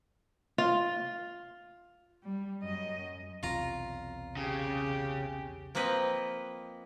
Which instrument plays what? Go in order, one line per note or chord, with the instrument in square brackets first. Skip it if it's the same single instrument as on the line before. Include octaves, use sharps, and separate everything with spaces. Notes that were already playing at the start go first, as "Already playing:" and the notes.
[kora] F4
[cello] G3
F#2 D#5
[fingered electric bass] B1 E2 C3 [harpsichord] F4 A#5
[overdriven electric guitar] C#3 [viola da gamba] G4
[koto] F3 A#3 C4 B4 D#5 G5